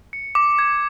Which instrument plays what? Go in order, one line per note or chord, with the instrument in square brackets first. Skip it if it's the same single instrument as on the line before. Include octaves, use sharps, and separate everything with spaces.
[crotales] C#7
D6
G#6